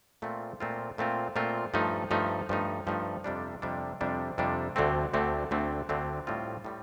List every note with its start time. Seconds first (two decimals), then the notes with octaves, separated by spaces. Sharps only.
0.22 A#2 A3 C4 F4
0.60 A#2 A3 C4 F4
0.98 A#2 A3 C4 F4
1.36 A#2 A3 C4 F4
1.74 G2 F3 A3 D#4
2.11 G2 F3 A3 D#4
2.49 G2 F3 A3 D#4
2.87 G2 F3 A3 D#4
3.24 F2 C3 G3 D4
3.62 F2 C3 G3 D4
4.01 F2 C3 G3 D4
4.38 F2 C3 G3 D4
4.76 D2 D3 A3 C4
5.14 D2 D3 A3 C4
5.51 D2 D3 A3 C4
5.89 D2 D3 A3 C4
6.27 A2 G3 C4 F4
6.65 A2 G3